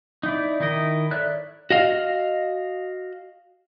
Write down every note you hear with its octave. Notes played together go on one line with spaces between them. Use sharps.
D#4 E4 D5
D#3 D#4 E4 A#4 D#5
A4 C#5 D5 E5 F#6
F#4 D#5 F5